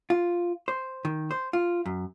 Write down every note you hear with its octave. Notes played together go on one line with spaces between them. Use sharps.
F4
C5
D#3
C5
F4
F#2